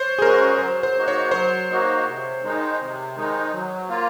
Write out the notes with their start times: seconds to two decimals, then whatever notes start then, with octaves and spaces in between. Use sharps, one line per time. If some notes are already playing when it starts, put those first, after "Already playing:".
Already playing: C5 C#5
0.19 G#4
0.22 G#3 C#4 F#4 A#4
0.59 F#3 C5
0.83 C5
0.95 A#3 D#4 F#4
1.08 C#5
1.31 F#3 C5
1.69 A#3 D#4 F#4
2.06 C3
2.42 D#3 G#3 D#4
2.79 C3
3.15 D#3 G#3 D#4
3.52 F#3
3.89 A#3 F4